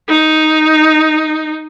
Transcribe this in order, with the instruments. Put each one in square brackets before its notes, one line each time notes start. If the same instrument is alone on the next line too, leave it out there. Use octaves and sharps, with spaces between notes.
[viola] D#4